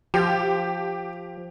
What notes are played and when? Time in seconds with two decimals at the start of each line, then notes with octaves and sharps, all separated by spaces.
0.14 F3 G4